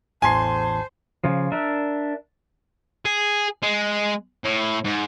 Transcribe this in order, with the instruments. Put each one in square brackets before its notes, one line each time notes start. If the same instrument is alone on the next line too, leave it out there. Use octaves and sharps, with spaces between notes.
[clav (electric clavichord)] A1 E2 A2 [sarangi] C5 [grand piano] G#5 C6 C7 [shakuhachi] A5
[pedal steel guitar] C#3 F3
D4 A#4 E5
[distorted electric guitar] G#4
G#3
A2
G#2